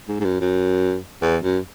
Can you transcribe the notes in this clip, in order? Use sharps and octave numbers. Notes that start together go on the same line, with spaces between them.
G#2
G#2
F#2
F#2
E2
F#2